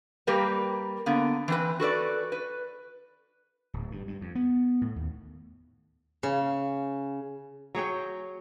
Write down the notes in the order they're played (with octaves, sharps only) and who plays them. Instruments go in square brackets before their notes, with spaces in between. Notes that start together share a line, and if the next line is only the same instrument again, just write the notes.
[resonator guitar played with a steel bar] G3 A#3 G4 A#4 B4
D3 A#3 B3
E3 C4 B4
F#4 A4 B4 D5
B4
[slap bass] D1
G2
G2
F2
B3
A2
D#2
[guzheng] C#3
[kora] F#3 G#4 C#5 G5